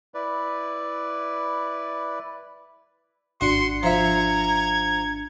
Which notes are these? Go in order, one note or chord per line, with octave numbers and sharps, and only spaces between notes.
E4 B4 D5
G#1 D4 F#4 C6 C#7
F3 E5 A#5 G#6